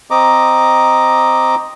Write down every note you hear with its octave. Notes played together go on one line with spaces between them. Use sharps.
C4 D#5 A#5 D6